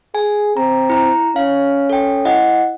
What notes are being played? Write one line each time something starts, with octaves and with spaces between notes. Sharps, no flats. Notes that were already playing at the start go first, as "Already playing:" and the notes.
G#4 G#5
C4 A#5
E4 A#5
C#4 F5
A4 G5
E4 D#5 F#5